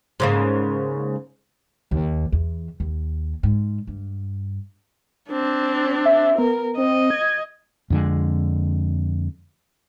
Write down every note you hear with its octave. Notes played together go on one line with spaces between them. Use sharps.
G#2 C#3 A#3
D#2
E2
D#2
G#2
G2
C4 D4
E5
B3 A#4
C4 D#5
G#6
F2 D3 G#3